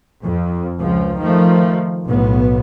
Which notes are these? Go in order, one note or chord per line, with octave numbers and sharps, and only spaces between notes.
F2
C#2 F3
D#3 F3 A3
B1 A2 B3